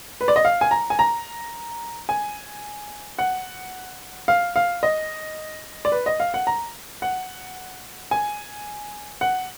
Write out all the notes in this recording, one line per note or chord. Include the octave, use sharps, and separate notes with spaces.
B4
D5
D#5
F5
G#5
A#5
G#5
A#5
G#5
F#5
F5
F5
D#5
D5
B4
D#5
F5
F#5
A#5
F#5
G#5
F#5